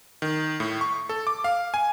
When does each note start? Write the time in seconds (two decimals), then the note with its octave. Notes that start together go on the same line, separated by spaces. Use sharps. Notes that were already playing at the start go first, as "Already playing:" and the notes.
0.22 D#3
0.60 A2
0.81 C#6
1.09 A4
1.27 D6
1.44 F5
1.74 G#5